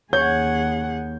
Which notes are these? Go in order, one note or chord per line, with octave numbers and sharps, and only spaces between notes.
D#2 G#4 C#5 F#5 G6